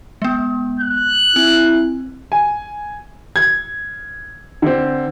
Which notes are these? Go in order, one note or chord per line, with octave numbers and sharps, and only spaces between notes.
G#3 B3
F#6
C4 E4
G#5
G#6
D3 C4